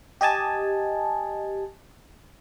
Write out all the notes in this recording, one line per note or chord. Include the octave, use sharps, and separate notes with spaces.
G4 D#5 G#5 A5